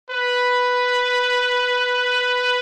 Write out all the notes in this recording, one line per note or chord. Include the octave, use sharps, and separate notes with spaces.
B4